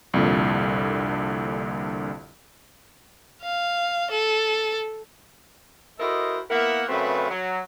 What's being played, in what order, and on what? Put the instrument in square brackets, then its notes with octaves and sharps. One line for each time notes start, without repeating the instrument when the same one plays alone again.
[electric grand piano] C2 F2 A#2 D3
[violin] F5
A4
[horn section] E4 F#4 A4 A#4 C5 D#5
A#3 B3 E4 A#4 E5 F#5
F#2 C#3 A3 C4 B4
F#3